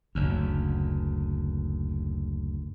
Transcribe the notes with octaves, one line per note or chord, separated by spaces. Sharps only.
F#1 D2